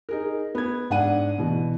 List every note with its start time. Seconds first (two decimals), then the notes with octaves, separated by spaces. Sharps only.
0.09 D#4 G#4 A#4
0.55 B3 G#6
0.90 G#2 D4 F#5 D#7
1.38 B2 E3